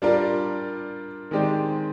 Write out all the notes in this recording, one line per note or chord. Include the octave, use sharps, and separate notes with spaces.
G3 D4 F4 A#4 D5
D#3 G#3 C4 G4 D5